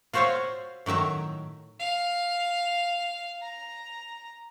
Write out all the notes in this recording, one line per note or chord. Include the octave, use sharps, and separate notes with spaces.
F4 F#4 C5 C#5 E5 F5
A2 D#3 F#3 E5 A#5
F5
A#5